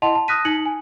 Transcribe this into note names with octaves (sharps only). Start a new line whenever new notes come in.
E4 D#5 F#5 A5 C6 F7
A5
D#6 F6 F#6 A#6 B6 D#7
D#4 C#7 F#7
G#5